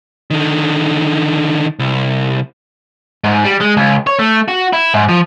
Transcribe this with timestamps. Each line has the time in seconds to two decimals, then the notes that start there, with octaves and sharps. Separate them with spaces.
0.30 D3 D#3
1.79 C2
3.24 G#2
3.45 G3
3.61 G#3
3.77 C#2
4.07 C#5
4.19 A3
4.49 F#4
4.73 E4
4.94 G#2
5.08 F3